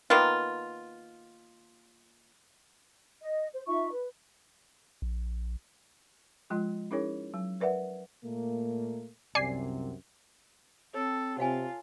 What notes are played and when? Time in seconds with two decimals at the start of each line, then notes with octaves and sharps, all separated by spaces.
0.10 D#3 A#3 B3 F4
3.21 D#5
3.53 C5
3.67 D#4 F4 E5 C#6
3.91 B4
5.02 A#1
6.50 F3 G#3 F4 D#5 C6
6.91 C#4 D#4 E4 G#4 A#4 C#5
7.34 F#3
7.60 A#4 B4 D5 E5 F#5
8.24 A#2 A3 A#3
9.35 C2 F#2 C3 D5 G#5 C7
10.94 C4 A4 C#5
11.38 C3 F4 C#5 F5 G#5